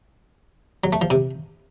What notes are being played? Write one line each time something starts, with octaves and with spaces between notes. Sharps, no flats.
F#3
A3
F3
C3